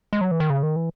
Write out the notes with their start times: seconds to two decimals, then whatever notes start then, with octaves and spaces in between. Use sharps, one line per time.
0.13 G#3
0.21 F#3
0.31 E3
0.40 D#3
0.50 C#3
0.63 D#3
0.76 E3